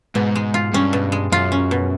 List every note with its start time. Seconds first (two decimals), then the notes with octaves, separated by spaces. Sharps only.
0.15 G#2 B2
0.36 G#3
0.54 F4
0.73 G2 C#4
0.93 B2
1.12 G#3
1.32 F#2 F4
1.52 C#4
1.71 B2